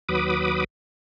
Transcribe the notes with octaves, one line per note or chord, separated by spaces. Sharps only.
D#2 F#3 B4 B5 D6 D#6